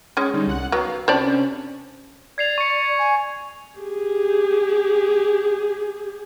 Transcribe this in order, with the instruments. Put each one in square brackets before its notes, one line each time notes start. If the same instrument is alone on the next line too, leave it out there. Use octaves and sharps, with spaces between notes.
[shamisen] G#3 C#4
[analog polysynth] D3 G3 D#4
C2 F#5 F#6
[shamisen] F#3 B3 [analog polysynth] F5
[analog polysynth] C3 C#4 D4 [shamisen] C5 D5 A5
[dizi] D5 [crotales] G#6 C7 F7
[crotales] C#6 C#7
[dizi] G#5
[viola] G4 G#4